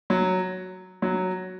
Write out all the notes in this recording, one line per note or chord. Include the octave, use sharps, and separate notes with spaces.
F#3
F#3